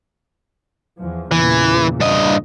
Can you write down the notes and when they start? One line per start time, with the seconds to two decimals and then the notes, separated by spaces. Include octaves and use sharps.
0.99 E2 F3
1.31 E2 A#2 C#3 E3
2.00 G2 D#5